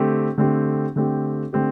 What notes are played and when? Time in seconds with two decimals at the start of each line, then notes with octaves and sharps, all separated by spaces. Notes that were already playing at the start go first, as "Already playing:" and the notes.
Already playing: D3 A3 C4 G4
0.38 D3 A3 C4 G4
0.96 D3 A3 C4 G4
1.53 D3 A3 C4 G4